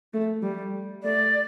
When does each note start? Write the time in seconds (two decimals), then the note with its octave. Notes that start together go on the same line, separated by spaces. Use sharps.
0.14 A3
0.43 G3
1.03 A3 D5